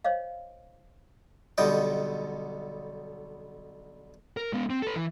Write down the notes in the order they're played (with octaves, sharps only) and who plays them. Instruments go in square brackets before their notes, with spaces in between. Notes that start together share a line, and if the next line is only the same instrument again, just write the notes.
[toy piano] C5 C#5 D#5 F5
[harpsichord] B1 B2 D3 G3 D#5 G5
[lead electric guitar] A#4
G#3 B3
C4
A4 B4
E3